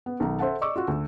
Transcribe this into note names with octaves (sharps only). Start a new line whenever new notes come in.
B3
B1 D#3 A#5
A4 C5 E5 F#5 A5
D5 D#5 C#6 D6 E6
F4 F#4
D2